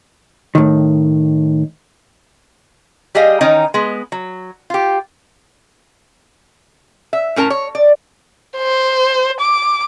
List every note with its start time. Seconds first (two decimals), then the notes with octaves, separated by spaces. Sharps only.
0.55 A2 D#3
3.15 G3 G4 G#4 D#5 F5
3.41 D#3 E3 C#4 D#4
3.74 G#3 B3
4.12 F#3
4.70 F4 G4
7.13 E5
7.36 A2 C#4 A#4 A5
7.50 C#5
7.75 D5
8.57 C5
9.40 D6